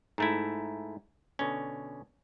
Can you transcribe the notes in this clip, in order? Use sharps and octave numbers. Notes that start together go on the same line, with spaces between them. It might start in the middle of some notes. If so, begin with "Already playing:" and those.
G#2 A3 E4
B2 D3 C#4